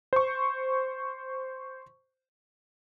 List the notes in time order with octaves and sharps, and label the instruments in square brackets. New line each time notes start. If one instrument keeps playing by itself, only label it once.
[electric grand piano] C5 C#6